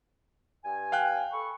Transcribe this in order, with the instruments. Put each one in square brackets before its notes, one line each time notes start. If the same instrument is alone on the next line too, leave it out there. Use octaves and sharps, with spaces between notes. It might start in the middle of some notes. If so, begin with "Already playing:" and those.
[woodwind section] G2 G#5
[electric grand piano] F5 G5 F#6
[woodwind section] A4 B5 C#6